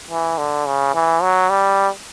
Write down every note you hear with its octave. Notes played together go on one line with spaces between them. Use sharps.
E3
D3
C#3
E3
F#3
G3